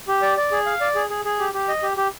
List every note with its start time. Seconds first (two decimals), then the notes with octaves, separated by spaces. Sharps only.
0.08 G4
0.22 D5
0.37 D5
0.52 G#4
0.66 F5
0.81 D5
0.95 G#4
1.10 G#4
1.25 G#4
1.39 G4
1.54 G4
1.69 D#5
1.83 G4
1.97 G4